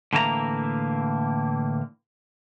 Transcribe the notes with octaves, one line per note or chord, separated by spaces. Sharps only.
A2 D3 E3 A#3 F4 A#5